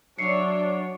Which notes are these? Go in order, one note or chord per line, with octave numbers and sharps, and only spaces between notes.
F#3 D4 C#5 D5 E5 C7 C#7